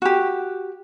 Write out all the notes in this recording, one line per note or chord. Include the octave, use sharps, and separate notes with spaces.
F#4 G4